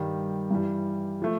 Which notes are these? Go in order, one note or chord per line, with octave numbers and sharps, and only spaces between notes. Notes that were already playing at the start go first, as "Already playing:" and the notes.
Already playing: G2 D#3 G3
G2 E3 G3
F3 A3